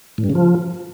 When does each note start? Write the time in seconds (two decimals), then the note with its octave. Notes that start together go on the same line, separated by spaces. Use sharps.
0.18 A2
0.24 G2
0.30 C#3
0.35 F3